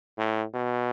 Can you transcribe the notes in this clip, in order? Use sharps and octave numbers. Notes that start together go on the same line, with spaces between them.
A2
B2